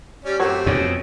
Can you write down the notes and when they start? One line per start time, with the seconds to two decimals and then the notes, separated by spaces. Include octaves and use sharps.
0.25 G3 C#4 G4 D5
0.40 F#2 A3 C4 C#5
0.66 F2 B2 C#4